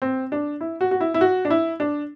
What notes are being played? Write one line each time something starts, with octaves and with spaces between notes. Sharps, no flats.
C4
D4
E4
F#4
F#4
E4
E4
F#4
D4
E4
D4